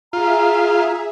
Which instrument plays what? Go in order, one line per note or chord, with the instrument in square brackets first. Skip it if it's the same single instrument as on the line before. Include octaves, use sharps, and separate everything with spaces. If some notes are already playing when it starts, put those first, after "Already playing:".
[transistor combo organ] F4 [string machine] G#4 E5 [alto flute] A#5